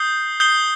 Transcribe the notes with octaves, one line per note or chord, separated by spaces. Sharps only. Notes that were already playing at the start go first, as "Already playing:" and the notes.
Already playing: D#6 G6 C7 G7
D#6 G6 C7 G7